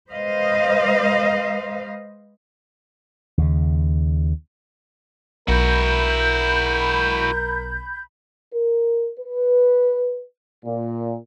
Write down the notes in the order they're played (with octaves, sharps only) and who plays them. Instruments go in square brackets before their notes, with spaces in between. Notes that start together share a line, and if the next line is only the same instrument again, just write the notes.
[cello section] G#3 B4 C5 D#5 F5
[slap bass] D#2 C#3
[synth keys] B1 [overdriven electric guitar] E4 F#4 [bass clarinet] A#4 [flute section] B5 G6
[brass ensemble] A#4
B4
A#2